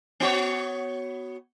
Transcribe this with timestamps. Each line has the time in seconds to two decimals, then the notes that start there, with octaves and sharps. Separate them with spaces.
0.20 B3 F#4 C#5